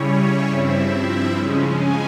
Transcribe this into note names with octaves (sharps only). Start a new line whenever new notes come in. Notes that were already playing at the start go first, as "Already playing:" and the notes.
Already playing: C#3 G3 C#4 E4 C#5
G2 F3 C4 E4 E5
C#3 F3 G#3 C#4
G#5